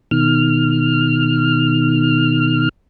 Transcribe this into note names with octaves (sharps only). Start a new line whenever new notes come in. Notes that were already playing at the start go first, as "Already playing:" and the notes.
B2 D#3 F6